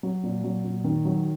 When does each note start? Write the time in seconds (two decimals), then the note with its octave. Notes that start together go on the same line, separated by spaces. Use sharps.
0.03 F#3
0.23 A#2
0.44 F#3
0.64 A#2
0.84 D#3
1.05 F#3